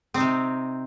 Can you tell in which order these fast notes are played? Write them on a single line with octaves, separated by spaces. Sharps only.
C4 D#4 C3